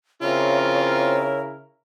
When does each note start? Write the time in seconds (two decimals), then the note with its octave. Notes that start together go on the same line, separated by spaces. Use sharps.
0.22 C#3 C4 E4 F4 A#4 C#5